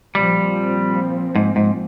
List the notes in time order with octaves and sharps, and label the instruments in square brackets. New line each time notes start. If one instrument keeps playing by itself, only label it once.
[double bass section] A#2 F3 C4 [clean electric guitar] G3
[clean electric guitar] G#2
G#2